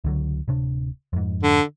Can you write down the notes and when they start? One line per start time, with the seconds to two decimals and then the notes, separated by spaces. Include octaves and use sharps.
0.04 C#2 D3 F#3
0.48 D1 C3 D4
1.13 F2 G#2
1.43 D3